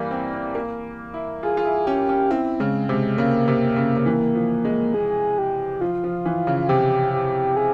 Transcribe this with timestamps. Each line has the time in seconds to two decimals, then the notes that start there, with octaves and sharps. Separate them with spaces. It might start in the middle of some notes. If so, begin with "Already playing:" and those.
Already playing: E3 G3 A#3
0.11 C4
0.34 C4
0.55 A#3
1.14 E4
1.43 F4 G#4
1.57 F4
1.65 E4
1.86 C#4 G4
2.09 C#4
2.31 C4 E4
2.60 C#3 G#3
2.89 C3 G#3
3.18 C#3 A#3
3.48 C3
3.76 C#3
3.96 C#3
4.06 E3
4.35 F3
4.65 G#3
4.94 G#4
5.38 G4
5.81 F3 F4
6.04 F3
6.25 E3
6.47 C#3
6.69 C3 G4
7.13 G4
7.56 G#4